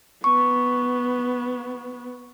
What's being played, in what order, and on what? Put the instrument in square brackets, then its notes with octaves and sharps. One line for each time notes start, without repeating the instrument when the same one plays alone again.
[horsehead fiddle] B3 [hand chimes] C#6